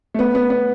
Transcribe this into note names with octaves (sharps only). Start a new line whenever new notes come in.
A3
B3
B3
B3